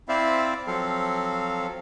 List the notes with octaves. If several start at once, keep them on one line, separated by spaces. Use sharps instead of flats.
C4 E4 C5 D5 E5 F5
F3 F#3 C4 A4 F5